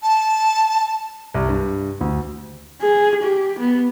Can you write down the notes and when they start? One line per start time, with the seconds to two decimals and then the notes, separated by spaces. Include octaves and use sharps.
0.02 A5
1.34 C2
1.49 G2
2.01 D2
2.82 G#4
3.23 G4
3.59 B3